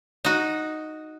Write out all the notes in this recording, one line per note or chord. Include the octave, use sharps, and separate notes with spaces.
D#4 F#4